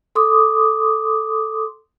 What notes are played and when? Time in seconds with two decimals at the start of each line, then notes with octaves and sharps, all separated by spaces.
0.15 A4 C6 D6 D#6